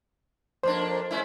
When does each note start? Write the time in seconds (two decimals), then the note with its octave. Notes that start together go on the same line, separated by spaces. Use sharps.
0.63 F2 A#3 D4 C5
1.11 G#3 C#4 E4